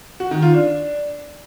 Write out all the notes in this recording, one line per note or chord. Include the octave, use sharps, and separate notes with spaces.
F#4
D#3
F4
D4